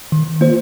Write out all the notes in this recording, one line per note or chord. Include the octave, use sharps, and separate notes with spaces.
D#3
A#3 F4 C5